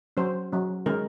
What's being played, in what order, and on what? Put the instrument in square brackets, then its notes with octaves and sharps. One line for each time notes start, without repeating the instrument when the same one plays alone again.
[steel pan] F#3 C#4 C5
F#3 C#4
D#3 G#3 C#4 A#4